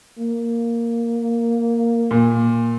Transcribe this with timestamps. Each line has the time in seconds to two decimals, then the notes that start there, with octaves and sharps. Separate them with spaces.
0.18 A#3
2.11 A#2